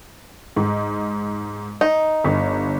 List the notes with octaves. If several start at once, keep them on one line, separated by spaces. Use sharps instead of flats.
G#2
D#4
G1